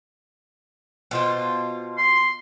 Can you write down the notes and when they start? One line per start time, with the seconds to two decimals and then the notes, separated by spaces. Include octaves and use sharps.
1.11 B2 F4 C5
1.98 C6